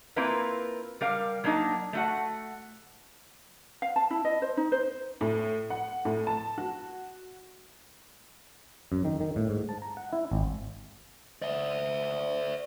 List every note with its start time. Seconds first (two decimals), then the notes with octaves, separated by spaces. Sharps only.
0.16 A#3 C4 E4 F4 A#4 B4
1.01 G3 A#4 F5
1.44 F#3 A#3 D4 D#4
1.93 A3 F#4 F#5
3.82 F5
3.96 A5
4.11 E4
4.25 D#5
4.42 C5
4.57 D#4
4.72 C5
5.21 A2
5.70 F#5
6.05 A2
6.27 A5
6.58 F#4
8.92 F#2
9.05 D#3
9.20 D#3
9.36 A2
9.49 G#2
9.69 A5
9.82 A#5
9.97 F#5
10.13 E4
10.31 G#1
11.42 D5 E5